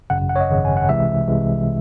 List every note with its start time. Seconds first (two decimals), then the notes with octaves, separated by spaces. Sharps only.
0.10 G#1 F#2 C#3 F#5
0.29 F#5
0.36 C#5
0.40 D#5
0.49 G#1 F#2 C#3
0.65 G#5
0.77 F#5
0.89 C2 C3 E3 G#3 E5
1.27 C2 C3 E3 G#3